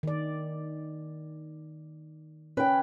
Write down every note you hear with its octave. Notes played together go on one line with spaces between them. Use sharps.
D#3 D5
C#4 B4 G5